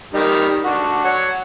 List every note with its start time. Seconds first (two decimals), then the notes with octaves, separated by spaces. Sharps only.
0.14 D#3 G3 D#4
0.65 D4 F#4
1.05 C#5 F#5